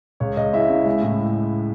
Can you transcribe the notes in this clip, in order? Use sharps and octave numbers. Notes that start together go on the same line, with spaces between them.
C#2 C#5
C#2 D#5
G#3 E4 E5
C#3
G#3
A2